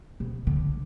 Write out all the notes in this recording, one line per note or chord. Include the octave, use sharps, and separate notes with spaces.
B2
D3